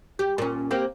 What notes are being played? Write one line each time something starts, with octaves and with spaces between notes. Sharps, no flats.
G4
A#2 C#4
A#3 C4 G4